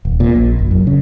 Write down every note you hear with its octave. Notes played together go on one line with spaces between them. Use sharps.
D#1
A#2
A#1
F#1
F#2
C#3